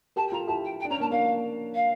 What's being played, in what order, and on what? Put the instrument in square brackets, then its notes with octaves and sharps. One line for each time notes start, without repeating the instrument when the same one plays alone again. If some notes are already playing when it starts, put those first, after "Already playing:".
[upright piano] G4 A#4 [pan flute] A5
[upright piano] F4 A4 [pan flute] A#5
[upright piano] E4 G4 [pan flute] A5
[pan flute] G5
G5
[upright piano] D4
[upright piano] C#4 [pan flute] A#5
[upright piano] A#3 D4 [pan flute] A5
[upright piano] A#3 D4 [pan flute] F5
[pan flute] F5